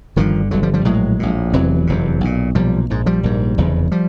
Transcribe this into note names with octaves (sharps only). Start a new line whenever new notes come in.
G1 G2 D3 D#3 F3
G1 G2 D3 F#3
F3 G3
F3 G3
A#1 A2 F#3 G#3
A#1 A2
F1 E2 C3 E3 F#3
F1 E2 C3
B1 A#2
B1 A#2 F3 G3
A#1 G#2
F3 G3
A#1 G#2
F1 E2 C#3
F3 G3